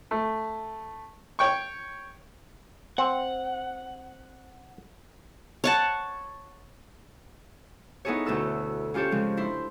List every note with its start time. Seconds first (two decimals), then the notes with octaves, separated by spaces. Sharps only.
0.11 A3
1.39 C#5 G5 C#6
2.98 C4 F#5
5.64 C#5 F#5 A5
8.05 B3 D#4 E4 G#4 A4 C#5
8.25 D2 B2 A4 E6 F#6
8.94 C#4 F4 G4 A4 C#5
9.11 C#3 F3 G#3
9.37 D4 E4 C6